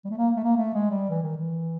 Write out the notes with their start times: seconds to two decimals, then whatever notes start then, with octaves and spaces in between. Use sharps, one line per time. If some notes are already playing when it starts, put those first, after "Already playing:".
0.05 G3
0.10 A3
0.18 A#3
0.37 A3
0.44 A#3
0.57 A3
0.75 G#3
0.91 G3
1.09 E3
1.23 D#3
1.37 E3